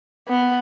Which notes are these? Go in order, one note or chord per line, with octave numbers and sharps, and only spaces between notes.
B3